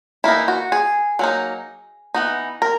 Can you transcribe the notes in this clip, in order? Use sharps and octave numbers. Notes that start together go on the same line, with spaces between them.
E3 A#3 D#4 E4
F#4
G#4
F#3 A#3 D#4
E3 B3 D#4
A#4